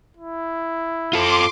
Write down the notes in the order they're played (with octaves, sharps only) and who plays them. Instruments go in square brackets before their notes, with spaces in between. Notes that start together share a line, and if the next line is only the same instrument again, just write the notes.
[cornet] E4
[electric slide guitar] F4 A4 [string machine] C6 D6